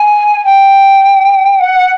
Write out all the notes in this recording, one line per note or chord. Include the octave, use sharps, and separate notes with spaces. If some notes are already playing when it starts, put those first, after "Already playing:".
Already playing: G#5
G5
F#5